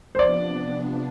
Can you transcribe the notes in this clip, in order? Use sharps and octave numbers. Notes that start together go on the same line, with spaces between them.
C5
C3 F3 B3 D4 D5